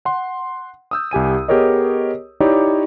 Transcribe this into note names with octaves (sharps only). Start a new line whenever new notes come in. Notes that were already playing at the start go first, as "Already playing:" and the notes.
F#5 C6
D#6 E6 G6
C2 G4 G#5 D#7
B3 G4 G#4 A#4 C#5 D#5
D#4 E4 G4 C#5 D5